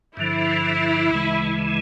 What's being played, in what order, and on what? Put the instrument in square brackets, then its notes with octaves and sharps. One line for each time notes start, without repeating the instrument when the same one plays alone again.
[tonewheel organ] G2 D3 F3 [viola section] E4
[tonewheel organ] D2 C#3 E3 G#3